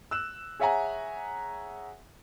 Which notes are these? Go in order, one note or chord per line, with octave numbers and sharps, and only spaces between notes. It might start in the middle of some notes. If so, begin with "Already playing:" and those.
E6 F#6 E7
G#4 C#5 E5 F#5 G#5 A#5